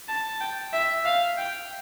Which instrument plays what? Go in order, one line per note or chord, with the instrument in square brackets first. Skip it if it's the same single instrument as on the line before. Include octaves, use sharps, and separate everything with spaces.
[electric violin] A5
G5
E5
F5
G5